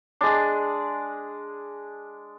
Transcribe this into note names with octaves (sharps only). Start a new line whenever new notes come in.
G#3 D4